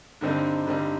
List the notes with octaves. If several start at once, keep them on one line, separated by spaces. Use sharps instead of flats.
G2 D3 G3 C4 D#4
G2 D3 G3 C4 D#4